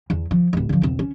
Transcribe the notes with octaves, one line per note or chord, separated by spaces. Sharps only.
E2
F3
D1 A1
D3 F3
E1 C4
C#4